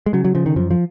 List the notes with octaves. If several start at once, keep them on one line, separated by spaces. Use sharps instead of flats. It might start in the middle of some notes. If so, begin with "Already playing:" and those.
G#3
C#3 F#3
F#3
C#3 F3
D#3
F#2 F3
F3